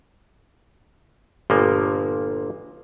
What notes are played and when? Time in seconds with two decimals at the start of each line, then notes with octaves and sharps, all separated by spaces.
1.50 G1 A#2 F3 A#3